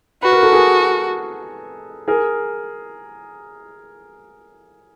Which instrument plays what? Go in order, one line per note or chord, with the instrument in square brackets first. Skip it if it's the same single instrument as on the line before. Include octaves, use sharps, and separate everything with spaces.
[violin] F#4 [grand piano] B4
[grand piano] A#4
A4
G#4 A#4
G#4 A#4